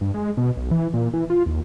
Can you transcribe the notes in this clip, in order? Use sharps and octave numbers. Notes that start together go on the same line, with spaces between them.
G2
G#3
B2
B1
E3
A#2
E3
F4
D#2